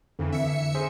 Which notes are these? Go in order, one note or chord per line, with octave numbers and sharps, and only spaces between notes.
F2 D3 E3
E5 C#7
G#4 C5